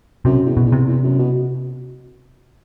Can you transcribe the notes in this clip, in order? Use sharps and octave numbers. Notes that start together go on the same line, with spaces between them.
F#2 C3
E2
B2
E2
C3
E2
F#2
B2